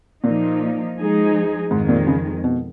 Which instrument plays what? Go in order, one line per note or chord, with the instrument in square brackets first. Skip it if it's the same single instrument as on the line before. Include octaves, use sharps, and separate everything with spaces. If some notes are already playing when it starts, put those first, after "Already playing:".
[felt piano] A#2 [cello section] F3 A#3 D#4
[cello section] F3 G#3 D#4 G#4
[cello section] F2 D#3 G#3 [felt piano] G#2
[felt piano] A#2
C#3
B2